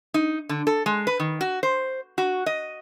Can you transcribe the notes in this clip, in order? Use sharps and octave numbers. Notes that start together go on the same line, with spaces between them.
D#4
D3
A4
G#3
B4
D#3
F#4
C5
F#4
D#5